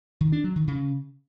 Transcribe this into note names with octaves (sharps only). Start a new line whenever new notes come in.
D#3
D4
F#3
D#3
C#3